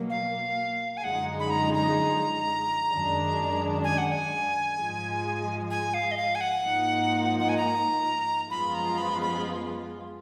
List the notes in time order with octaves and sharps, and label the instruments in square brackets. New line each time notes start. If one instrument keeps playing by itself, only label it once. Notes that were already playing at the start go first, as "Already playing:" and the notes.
Already playing: [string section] B2 F#3 A#3
[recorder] F5
G#5
[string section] F#2 D3 F3 G#3 D#4 [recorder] F#5
[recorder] B5
A#5
A#5
[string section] F#2 D#3 G#3 D4
[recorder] G#5
F#5
G#5
[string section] G#2 F3 G#3
[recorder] G#5
F5
D#5
F5
G#5
F#5
[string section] G#2 F3 A#3 D#4
[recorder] F#5
G#5
A#5
[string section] F#2 F3 G#3 B3 F4 [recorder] B5
[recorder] A#5
B5
B5